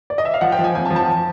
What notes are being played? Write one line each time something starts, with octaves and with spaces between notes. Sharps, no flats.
D5
D#5
E5
F5
F3 F#5
G5
F3
G#5
F2 G#5
A5
F3
A5